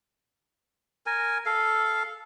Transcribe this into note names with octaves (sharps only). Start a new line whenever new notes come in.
A#4 G#5
A4 F5